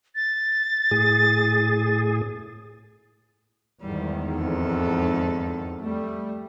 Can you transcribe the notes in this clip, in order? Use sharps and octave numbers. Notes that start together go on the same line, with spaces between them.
A6
A2 G#4
E2 G#2 D#3 G3
F2 A4
G3 A3